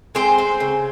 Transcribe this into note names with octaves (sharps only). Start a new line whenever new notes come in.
G#3 C4 C5
C4
C#3